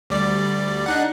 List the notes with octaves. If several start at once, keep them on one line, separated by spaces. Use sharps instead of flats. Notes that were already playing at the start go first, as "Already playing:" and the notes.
D2 G3 D5
D4 D#4 F#5